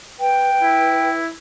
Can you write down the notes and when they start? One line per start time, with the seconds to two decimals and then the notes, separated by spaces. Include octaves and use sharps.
0.19 B4 G5
0.63 E4